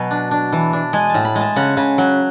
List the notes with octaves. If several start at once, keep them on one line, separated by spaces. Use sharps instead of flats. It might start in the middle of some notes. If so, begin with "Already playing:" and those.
Already playing: B2 F#3 G#5
D4
D4
E3
D4
G#3 G#5
A2 A5
B5
G#3
A5
C#3 F#5
C#3
F#3